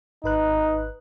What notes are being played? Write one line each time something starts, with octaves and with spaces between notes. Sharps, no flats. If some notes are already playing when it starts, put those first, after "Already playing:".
G#1 D#4 B4 F#6